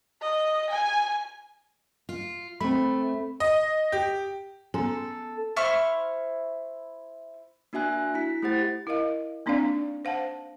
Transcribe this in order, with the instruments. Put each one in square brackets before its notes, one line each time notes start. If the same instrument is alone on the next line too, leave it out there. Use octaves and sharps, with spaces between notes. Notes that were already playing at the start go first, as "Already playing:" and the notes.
[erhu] D#5
G#5
[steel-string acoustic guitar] F4
[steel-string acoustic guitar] A3 [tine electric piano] C4 B5
[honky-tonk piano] D#5
G4
[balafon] B3 C#4 G#5 [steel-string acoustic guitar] A4
[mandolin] E4 C5 C#6 F6
[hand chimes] A#3 D4 F#4 E5 G#5 F#6
E4 B6
A3 E4 G4 C5 F#5 A6
[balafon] E4 A#4 D#5 F5
A#3 C4 D4 D#4 D5 F5
C5 F5 F#5 A5